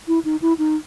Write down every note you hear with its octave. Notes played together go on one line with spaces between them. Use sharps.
E4
D#4
E4
D#4